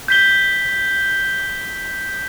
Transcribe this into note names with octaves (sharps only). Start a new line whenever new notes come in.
G6 B6 G7